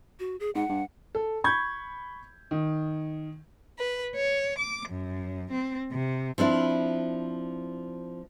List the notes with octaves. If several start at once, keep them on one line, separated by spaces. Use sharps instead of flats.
F#4
G#4
G#2 F#5
G2
A4
B5 C#6 G6 G#6
D#3
B4
C#5
D6
F#2
C4
C3
F3 C4 D4 E4